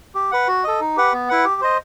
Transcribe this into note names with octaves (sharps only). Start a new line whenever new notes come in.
G4
B4 F#5
F#4
A4 D#5
D#4
G4 B4 F#5
B3
E4 B4 F#5
G4
C5 D#5